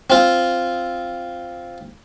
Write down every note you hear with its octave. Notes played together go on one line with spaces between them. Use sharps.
C4 F4